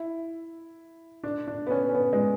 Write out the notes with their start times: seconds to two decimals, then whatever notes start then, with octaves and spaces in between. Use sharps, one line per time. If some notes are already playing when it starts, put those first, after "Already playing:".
Already playing: E4
1.24 D4
1.47 D4
1.67 B3
1.71 C#4
1.89 C#4
1.95 B3
2.13 G#3